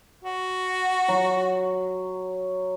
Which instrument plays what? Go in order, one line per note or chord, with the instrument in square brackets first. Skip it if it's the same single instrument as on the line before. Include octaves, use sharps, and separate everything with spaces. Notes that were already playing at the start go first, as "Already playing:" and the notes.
[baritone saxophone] F#4
[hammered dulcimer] F#3